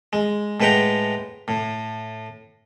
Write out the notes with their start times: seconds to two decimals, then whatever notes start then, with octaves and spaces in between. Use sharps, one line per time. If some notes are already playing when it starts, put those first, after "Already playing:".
0.13 G#3
0.60 A2 G#3 B4 F#5 G5 A#5
1.48 A2